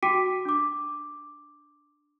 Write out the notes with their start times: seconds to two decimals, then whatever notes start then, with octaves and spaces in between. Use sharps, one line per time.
0.03 F#4 G5 D6 B6 D7 D#7
0.45 D4 D6